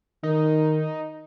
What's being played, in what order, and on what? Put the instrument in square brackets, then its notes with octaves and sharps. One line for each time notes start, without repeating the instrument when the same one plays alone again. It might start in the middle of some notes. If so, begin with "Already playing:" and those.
[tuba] D#3 [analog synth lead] D#4